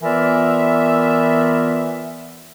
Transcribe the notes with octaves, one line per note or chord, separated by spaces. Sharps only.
E3 B3 F4 A#4 D5 E5